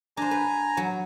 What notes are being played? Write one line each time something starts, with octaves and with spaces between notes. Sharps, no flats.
D4 C5 G#5 A#5
B4
F#3